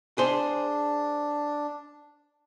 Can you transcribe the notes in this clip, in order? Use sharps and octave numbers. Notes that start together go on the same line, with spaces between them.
D4 G#4 C5